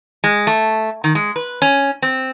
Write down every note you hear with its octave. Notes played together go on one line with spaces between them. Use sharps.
G#3
A3
D#3
G#3
B4
C#4
C4